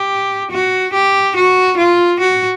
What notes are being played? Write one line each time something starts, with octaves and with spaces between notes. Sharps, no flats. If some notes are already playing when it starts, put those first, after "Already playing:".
Already playing: G4
F#4
G4
F#4
F4
F#4